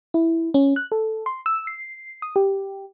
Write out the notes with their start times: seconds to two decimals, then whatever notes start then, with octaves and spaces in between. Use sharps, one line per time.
0.14 E4
0.54 C#4
0.76 F#6
0.92 A4
1.26 C6
1.46 E6
1.67 C7
2.22 D#6
2.36 G4